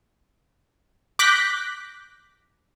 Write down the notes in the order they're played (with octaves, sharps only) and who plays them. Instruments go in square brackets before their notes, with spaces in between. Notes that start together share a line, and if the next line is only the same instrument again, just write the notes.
[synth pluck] D6 F#6 G6 A#6 B6